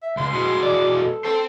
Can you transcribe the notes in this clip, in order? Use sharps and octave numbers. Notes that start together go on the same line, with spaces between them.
E5
C#2 C6
B2 G#3
D5
A4
A4 C5 G5